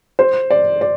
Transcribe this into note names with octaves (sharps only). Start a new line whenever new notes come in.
C5
D5
D5